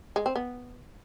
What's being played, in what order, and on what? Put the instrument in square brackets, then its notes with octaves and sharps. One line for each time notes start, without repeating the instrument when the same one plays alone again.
[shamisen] G#3
C4
B3